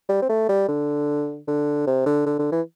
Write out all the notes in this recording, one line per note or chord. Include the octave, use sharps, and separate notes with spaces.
G3
C4
A3
G3
D3
D3
C3
D3
D3
D3
E3